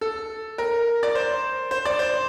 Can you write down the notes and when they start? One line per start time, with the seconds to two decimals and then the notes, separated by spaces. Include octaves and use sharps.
0.01 A4
0.58 A#4
1.03 D5
1.15 C5
1.71 C5
1.85 D5
1.99 C5